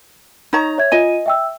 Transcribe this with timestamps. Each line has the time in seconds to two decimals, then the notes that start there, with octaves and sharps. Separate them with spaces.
0.53 D#4 C#5 A#5
0.78 C#5 E5 G#6
0.92 F4 D#5 G#5 D#7
1.26 E5 G5 E6